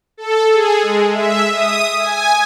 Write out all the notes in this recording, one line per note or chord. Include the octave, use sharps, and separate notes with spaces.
A4
G#4
G#3
E5
D#6
G#5